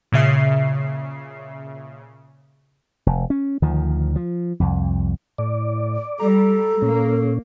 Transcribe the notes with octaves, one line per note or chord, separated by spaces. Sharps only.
A#2 C#3 E5 C7
F1
C#4
D2 D#3 F3
F3
C2 F2
A2 D5
G3 A4 A#5
A#2 A#3 C#4